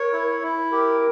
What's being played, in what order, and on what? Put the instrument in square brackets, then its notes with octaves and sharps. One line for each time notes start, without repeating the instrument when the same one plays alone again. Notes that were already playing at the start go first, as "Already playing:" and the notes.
Already playing: [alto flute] A#4 [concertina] C#5
[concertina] E4
E4
[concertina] G4 [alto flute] A#4